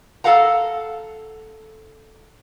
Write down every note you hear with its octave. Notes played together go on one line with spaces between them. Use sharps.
A4 F5 F#5 A#5